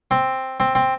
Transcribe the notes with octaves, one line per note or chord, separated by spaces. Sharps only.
C4
C4
C4